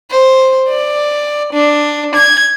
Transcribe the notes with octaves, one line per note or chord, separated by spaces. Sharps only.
C5
D5
D4
G#6